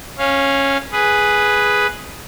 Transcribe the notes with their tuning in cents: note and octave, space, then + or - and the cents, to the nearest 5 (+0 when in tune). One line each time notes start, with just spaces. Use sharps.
C#4 -10 F5 +0
G#4 +0 B4 +0